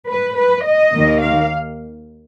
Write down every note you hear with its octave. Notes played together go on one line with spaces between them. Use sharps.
B4
B4
D#5
D#2 D#3 A#3
F5